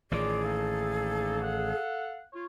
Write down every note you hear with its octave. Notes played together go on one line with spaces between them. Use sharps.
A1 A2 D#3 F4 G#4 D5 D6
A#3 D#4 A4
A4 F5 F#5
F4 C#5